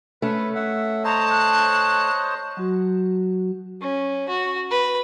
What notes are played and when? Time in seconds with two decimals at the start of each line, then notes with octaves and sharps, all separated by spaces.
0.22 A3 C#4 B4
0.55 E5 F#5
1.04 C5 C#5 D#5 A5 A#5
1.30 F#6
2.57 F#3 F#4
3.81 C#4
4.29 F#4
4.70 B4